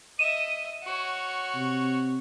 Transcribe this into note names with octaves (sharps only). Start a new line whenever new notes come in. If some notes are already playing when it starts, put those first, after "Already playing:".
D#5 E5 D#7 E7
F#4 C#5
C3